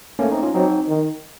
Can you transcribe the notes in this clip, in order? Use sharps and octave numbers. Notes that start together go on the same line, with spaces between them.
A3 A#3 C#4
C4 D#4
C#4 F4
F#3 C4 D#4
D#3